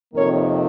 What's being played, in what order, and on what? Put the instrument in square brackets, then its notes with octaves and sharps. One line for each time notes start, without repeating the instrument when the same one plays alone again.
[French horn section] F2 C3 D#3 A#3 A#4 C#5